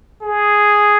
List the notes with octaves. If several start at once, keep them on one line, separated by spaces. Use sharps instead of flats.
G#4